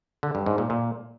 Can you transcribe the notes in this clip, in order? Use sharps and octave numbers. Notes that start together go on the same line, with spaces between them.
D3
G2
G#2
A#2
A#2